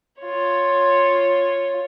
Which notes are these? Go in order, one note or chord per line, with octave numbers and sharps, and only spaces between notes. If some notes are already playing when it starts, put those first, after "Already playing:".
F4 C#5